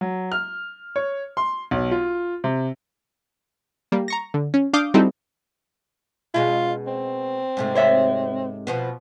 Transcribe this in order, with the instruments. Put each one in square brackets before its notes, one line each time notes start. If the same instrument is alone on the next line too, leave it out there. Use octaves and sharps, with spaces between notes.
[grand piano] F#3
F6
C#5
C6
B1
F4
C3
[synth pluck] G3 A#3
A#5 C#6 A#6
D3
C#4
D4 F5 D6 D#6 G6
G3 C4 D#4 E4 F#4 A4
[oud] B2 G#3 C#4 [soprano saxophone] F4
[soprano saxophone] C4
[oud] G#2 C3 A3
[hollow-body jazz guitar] C5 C#5 E5
[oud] B2 F3 B3